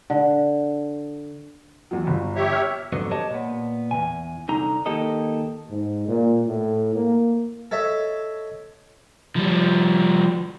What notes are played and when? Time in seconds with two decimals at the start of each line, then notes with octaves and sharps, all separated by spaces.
0.10 D3
1.91 E2 F#3
2.07 G1
2.36 G4 C#5 E5
2.53 E6 F6
2.93 F2 G#2 D3 F#3 B3
3.11 G4 C#5 D#5 A5
3.30 A#2 B3
3.91 E2 E3 G#5
4.48 C2 D3 D#4 A#5
4.86 D#3 A#3 D#4 G4 A4 D#5
5.70 G#2
6.08 A#2
6.47 A2
6.95 A#3
7.71 A4 C#5 D#5 E5 A5
9.36 F3 G3